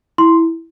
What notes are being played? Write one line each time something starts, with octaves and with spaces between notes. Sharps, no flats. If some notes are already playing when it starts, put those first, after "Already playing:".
E4 C6